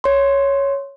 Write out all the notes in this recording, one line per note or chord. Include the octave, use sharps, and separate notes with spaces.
C#5 C6